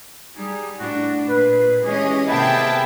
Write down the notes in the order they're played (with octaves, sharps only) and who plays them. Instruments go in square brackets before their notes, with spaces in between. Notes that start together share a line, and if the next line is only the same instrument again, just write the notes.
[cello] G3 [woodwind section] D#4 G#4
[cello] A2 D4 [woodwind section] E4 F#4
[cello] A#2 [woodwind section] B4
[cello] E3 G#3 [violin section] C#4 D#5 [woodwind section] E4 G4 G#4
[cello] C3 A#3 [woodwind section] D#3 B3 [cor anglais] E4 [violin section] G#4 G5 A5